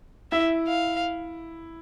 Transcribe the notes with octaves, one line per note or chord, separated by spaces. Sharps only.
E4 E5
F5